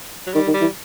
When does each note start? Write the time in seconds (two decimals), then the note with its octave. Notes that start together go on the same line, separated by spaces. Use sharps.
0.27 F#3
0.34 D#3 G3
0.47 D#3
0.54 G3
0.61 E3